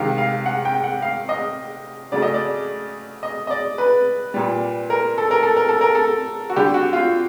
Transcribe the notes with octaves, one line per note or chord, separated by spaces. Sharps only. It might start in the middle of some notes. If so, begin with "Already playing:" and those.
Already playing: C3 D#3 G#3 F5
F5
F#5
G5
F#5
F5
D#5
C#3 F#3 A3 D5
D#5
D5
D#5
D#5
D5
B4
A#2 G3
A#4
A4
A#4
A4
A#4
A4
A#4
A4
F#4
D3 G3 G4
F#4
F4